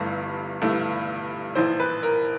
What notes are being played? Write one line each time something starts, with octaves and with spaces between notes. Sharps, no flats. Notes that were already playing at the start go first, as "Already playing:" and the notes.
Already playing: G1 G2 E3 A3
G1 G2 E3 A3
A#1 A2 E3 C5
B4
A#4